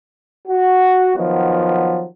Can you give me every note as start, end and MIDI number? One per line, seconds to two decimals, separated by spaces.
0.48 1.16 66
1.16 2.06 51
1.16 2.06 53
1.16 2.06 54
1.16 2.06 59